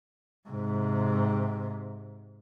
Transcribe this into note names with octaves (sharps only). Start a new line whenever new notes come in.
G#2 C3